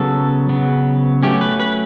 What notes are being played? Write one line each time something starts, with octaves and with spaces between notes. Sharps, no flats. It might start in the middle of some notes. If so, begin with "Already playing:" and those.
Already playing: C#3 F#3 B3 A4
C#3 F#3 B3
F#3 A3 C#4 G4
B4
B4